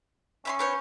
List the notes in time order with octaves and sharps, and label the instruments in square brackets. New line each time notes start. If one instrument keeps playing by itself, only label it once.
[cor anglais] C#4 [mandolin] E5 B5 C6
[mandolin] B3 C5 C#5